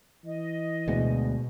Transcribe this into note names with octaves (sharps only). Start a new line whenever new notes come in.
E3 D#5
D2 B2 G#3 B3